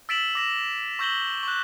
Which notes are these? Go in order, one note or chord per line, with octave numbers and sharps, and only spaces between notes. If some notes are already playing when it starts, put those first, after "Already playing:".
E6 A6 B6 D7 E7 F#7
D6 A#6 E7
C#6 E6 G6 A#6 F#7 G7
C#6 F#6